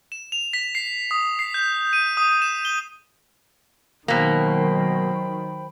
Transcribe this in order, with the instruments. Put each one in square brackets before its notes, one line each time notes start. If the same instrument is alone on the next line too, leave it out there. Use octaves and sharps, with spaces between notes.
[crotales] E7
F7
B6
C7
D#6
C7
G6
D#7
D#6
E7
G7
[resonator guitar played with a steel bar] B2 A#3 [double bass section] D#3 F#3 [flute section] C5 G5 B5